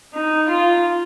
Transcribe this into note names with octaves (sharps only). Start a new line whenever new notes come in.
D#4
F4